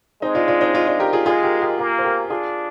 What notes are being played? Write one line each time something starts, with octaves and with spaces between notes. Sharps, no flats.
G#3 C4 D#4
D4 F4
D4 F4
C4 D#4
D4 F4
D4 F4
G4 A#4
F4 G#4
G#3 F4 G#4
G4 A#4
G4 A#4
A#3 G4 A#4
C5
G4 A#4
D4 F4 G#4